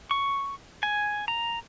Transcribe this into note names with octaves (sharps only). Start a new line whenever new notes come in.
C#6
G#5
A#5